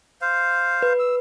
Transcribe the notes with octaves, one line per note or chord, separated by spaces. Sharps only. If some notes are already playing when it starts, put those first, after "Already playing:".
C5 F5
B4
E6